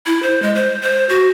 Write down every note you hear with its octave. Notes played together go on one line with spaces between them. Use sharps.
E4
C5
G#3
C5
C5
F#4